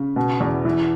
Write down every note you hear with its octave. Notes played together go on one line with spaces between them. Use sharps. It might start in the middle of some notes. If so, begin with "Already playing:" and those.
Already playing: C#3
B2
E2
E3